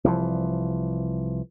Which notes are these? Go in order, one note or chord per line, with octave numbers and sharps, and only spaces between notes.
C2 E3 F3